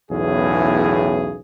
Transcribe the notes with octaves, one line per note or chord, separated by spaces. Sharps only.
B1 E2 A2 C#3 G#4